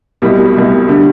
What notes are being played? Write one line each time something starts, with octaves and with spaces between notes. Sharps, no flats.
C2 B2 G3
C2 B2 G3
D3 G3